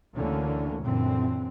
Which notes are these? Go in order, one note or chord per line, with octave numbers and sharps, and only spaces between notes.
D2 D3 E3 A#3 C#4
F#2 A#2 D3 E3 C4